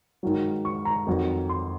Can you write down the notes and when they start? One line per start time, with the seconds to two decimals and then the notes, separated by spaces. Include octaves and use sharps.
0.23 G#2 D#3 F#3
0.65 C#6
0.85 A#5
1.07 F2 D#3 F#3
1.49 C6